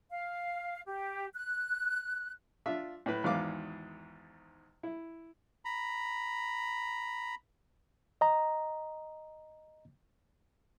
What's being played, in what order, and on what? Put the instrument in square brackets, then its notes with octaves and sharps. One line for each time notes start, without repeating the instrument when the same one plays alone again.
[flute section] F5
G4
F#6
[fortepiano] D4 F4 E5
A2 B4
G#1 E2 G#2 B3 F5 D6
E4
[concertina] A#5 B5
[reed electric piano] D#5 A#5